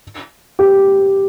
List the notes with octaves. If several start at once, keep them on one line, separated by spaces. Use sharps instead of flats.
G4